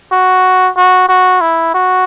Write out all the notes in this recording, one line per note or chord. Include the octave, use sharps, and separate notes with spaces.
F#4
F#4
F#4
E4
F#4